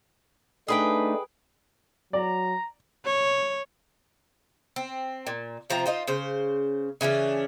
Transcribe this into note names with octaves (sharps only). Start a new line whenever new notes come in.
A3 D4 D#4 G#4 B4 G5
F#3 D5 A#5
C#5
C4
A#2
C3 F3 C4 A#5
D#4 F4 C5
C#3 C5
C#3 E3 C#4 D4